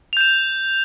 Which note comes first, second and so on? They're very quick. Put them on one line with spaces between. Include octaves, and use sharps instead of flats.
F7 G6 E7